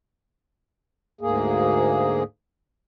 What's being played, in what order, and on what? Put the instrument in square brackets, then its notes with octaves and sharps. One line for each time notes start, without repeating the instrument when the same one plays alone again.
[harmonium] D2 G#2 A#3 G#4